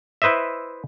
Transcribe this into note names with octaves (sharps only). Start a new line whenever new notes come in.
E4 B4 C5 D#5 E5